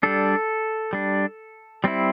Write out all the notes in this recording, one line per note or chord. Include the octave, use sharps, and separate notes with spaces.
G3 D4 A4
G3 D4
G3 C4 E4